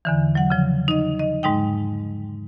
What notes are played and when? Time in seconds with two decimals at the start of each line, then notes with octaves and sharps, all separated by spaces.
0.05 E2 D3 E3
0.35 F#3 F#5
0.50 C#3 F3
0.88 D#4 D#5
1.19 D#5
1.43 G#2 G#3 D#4 G5